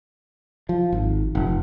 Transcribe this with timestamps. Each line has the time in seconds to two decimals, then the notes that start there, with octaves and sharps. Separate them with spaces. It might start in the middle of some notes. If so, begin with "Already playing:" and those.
0.69 F3
0.92 G#1
1.35 F1